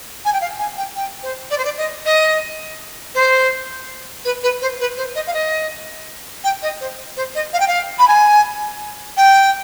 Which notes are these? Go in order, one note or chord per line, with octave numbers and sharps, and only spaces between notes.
G#5
G5
F5
G#5
G5
G5
C5
D5
C5
D5
D#5
D#5
C5
B4
B4
C5
B4
C5
D#5
F5
D#5
G5
D#5
C5
C5
D#5
F5
G5
F5
B5
G#5
G5